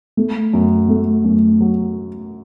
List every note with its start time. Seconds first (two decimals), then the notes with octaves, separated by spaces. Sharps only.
0.17 A3
0.53 F#2
0.89 A3
1.24 F#2
1.61 F#3